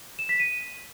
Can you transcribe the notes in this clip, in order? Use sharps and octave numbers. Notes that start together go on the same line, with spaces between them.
E7
B6
D#7